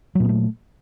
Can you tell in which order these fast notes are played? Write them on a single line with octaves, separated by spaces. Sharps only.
F#3 A#2 B3 A3